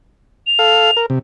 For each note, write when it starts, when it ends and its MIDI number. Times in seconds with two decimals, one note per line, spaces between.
0.47 1.00 101
0.59 0.91 69
0.59 0.91 77
0.97 1.06 70
1.10 1.19 48